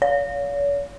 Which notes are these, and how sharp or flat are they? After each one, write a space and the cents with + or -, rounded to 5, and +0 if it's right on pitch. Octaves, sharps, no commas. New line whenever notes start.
C#5 +40